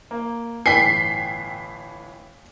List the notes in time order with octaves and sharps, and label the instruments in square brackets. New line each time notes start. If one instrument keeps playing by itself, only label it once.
[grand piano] A#3
[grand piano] G1 A2 E3 [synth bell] G5 G#5 [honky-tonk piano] B6 C7